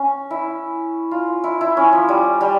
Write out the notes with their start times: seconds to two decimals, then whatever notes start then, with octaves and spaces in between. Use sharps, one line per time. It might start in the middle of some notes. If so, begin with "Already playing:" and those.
Already playing: C#4
0.30 E4
1.11 F4
1.44 E4
1.61 E4
1.77 C#4
1.93 F3
2.09 G3
2.41 G3